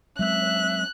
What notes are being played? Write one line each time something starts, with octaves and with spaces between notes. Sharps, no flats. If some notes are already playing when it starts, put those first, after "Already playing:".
F#3 G#3 C4 E5 F#6